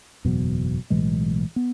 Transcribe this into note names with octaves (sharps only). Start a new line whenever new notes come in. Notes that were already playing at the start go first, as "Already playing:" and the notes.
F#1 E2 B2 F#3
B1 A2 E3 G#3
B3